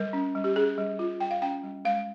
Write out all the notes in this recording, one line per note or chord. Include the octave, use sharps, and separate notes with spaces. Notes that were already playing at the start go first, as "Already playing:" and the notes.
Already playing: G3 A#4
C#4
G3
G4
C#4 G#4
G3
F4
G3 G5
F5
C#4 G5
G3
G#3 F5